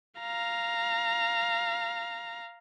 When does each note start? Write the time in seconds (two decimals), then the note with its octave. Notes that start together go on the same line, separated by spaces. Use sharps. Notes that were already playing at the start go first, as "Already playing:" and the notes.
0.20 F5 A#5